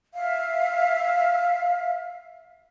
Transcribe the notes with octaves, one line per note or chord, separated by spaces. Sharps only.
E5 F5